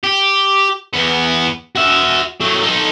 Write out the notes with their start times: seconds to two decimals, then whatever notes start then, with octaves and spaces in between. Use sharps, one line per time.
0.04 G4
0.94 E2 B3
1.76 F#4 E5
2.40 F#3 A3
2.63 D#4 A4